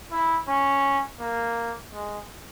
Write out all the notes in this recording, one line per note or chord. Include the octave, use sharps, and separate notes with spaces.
E4
C#4
A#3
G#3